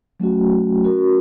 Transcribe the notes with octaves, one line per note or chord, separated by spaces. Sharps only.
F#3 A3 C#4 F#4
C#4 F#4 A#4